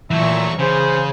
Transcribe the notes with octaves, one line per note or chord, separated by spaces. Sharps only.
A#2 E3 F#3 A3 E5 C#6 G6 G#6
C#3 G#4 C5